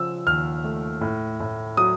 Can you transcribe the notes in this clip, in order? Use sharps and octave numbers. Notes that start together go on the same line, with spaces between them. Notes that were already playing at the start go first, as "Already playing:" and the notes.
Already playing: C#3 F3 E6
D#2 F6
A3
A2
A2
F#3 D#6